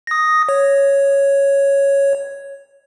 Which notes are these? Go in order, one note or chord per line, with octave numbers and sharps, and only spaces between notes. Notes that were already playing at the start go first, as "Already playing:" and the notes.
D#6 A#6
C#5